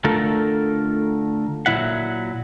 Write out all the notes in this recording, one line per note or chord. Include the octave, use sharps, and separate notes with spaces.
D3 A3 F4 A4 A#4
A#2 F#3 G3 E4 E5 F#5